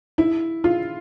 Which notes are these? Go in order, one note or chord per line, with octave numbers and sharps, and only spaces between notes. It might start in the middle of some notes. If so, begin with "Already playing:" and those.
E4
F4